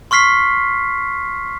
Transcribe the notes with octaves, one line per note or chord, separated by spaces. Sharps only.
C6 C#6 F6 B6 C7